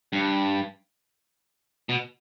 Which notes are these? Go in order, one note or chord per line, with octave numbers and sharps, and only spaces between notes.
G2
B2